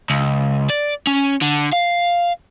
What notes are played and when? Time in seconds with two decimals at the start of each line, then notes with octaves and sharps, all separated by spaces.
0.10 C#2
0.70 D5
1.07 C#4
1.42 D3
1.73 F5